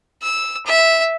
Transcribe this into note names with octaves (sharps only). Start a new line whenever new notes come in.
E6
E5